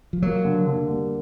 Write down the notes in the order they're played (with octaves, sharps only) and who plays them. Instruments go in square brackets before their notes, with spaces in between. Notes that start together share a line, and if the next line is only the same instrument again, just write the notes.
[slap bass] F3
[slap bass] F#3 [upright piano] A#3
[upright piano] D3
D3
G3